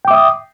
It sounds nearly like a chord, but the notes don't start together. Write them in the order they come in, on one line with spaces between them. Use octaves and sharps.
G5 D6 E5 D#6